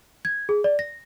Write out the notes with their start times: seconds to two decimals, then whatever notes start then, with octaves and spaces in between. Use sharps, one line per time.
0.25 G#6
0.49 G#4
0.64 D5
0.79 A#6